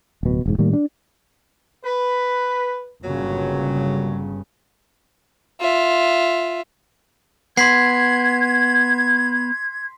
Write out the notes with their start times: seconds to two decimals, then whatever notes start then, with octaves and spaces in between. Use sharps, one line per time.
0.23 D1 B2
0.46 E1 G#2
0.58 A2 D#3 G3 A#3
0.73 D4
1.84 B4
3.03 G1 G2 A#2 C#3 F#3
5.61 F4 E5
7.57 B3 C6 G#6 B6 C7